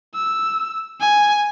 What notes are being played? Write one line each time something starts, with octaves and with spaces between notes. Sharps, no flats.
E6
G#5